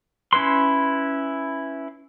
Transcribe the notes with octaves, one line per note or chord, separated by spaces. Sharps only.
C#4 E4 B4 C6